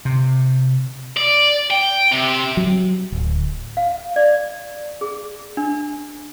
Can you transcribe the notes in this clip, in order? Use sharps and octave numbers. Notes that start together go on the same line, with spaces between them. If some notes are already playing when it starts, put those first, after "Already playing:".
C3
D5
G5
C3
F#3
D1
F5
D5
G#4
D4